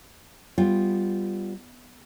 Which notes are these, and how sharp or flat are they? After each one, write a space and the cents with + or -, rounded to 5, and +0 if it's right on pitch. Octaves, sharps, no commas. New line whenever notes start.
G3 +0 B3 +0 F4 +0